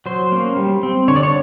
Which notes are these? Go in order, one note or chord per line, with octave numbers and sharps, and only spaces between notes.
F#3 C5
A#3 C#4
G3
C4
D3 C#5
D5
C#5